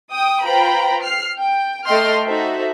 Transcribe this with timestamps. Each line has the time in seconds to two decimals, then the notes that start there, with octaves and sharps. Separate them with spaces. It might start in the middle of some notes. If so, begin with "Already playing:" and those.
0.11 G5 D#6
0.44 F4 B4 C5 G5 A#5 B5
1.02 F6 C7
1.37 G5
1.86 A3 A4 D#5 G5 C6 F6
2.25 D#4 F#4 A4 C5 E5